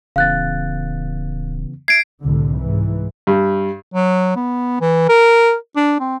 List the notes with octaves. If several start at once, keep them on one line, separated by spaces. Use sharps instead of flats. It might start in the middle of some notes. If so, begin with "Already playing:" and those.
D1 C#3 E3 B3 F5 F#6 A6
E5 G#6 C7 D7
C2 A2 D3
G#2 E3
G2
F#3
B3
E3
A#4
D4
C4